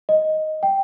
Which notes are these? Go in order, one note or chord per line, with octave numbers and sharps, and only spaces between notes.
D#5
G5